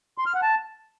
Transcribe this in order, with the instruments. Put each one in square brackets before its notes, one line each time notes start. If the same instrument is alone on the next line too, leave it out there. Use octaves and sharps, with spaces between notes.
[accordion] C6
F6
F#5
A5